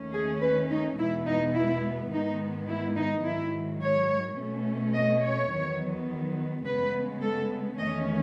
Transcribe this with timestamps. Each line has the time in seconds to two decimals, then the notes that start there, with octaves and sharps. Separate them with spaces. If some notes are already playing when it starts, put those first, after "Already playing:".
Already playing: D#2 D#3 A3 C#4
0.13 G#4
0.42 B4
0.70 D#4
0.98 E2 B2 G#3 B3 E4
1.27 D#4
1.55 E4
2.12 G#2 D#3 G#3 B3 D#4
2.68 E4
2.96 D#4
3.25 G#2 D#3 F#3 E4
3.82 C#5
4.38 B2 A3 C#4
4.94 D#5
5.23 C#5
5.52 E2 D#3 F#3 B3
6.65 C#3 G#3 B3 B4
7.22 A4
7.78 E2 D#3 A3 C#4 D#5